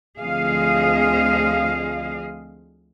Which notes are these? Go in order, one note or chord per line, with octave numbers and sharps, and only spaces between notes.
D2 F3 C4 G#4 D#5 F5